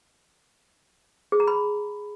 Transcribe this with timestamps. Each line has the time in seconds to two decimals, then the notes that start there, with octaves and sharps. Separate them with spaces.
1.32 G#4
1.40 A#5
1.48 B5